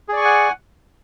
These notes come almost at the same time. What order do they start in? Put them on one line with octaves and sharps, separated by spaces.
G#4 D5 C#6 G#5 F#5